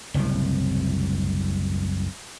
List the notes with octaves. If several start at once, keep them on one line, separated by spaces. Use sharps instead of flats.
F#1 C2 A2 C3